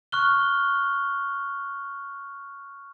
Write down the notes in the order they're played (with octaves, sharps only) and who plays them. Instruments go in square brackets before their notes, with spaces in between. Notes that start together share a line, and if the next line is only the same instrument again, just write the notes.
[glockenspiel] C#6 F6 F#6 G7